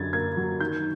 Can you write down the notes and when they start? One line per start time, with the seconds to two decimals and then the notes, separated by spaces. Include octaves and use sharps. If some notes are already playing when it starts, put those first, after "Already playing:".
Already playing: F#2 D3 G#6 A6
0.13 A#3 G#6
0.37 F#3
0.60 D#3 G6